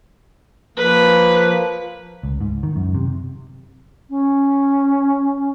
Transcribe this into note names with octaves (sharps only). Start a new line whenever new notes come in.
F3 A#3 B4
C#2
G#2
D#3
F#2
C3
C#4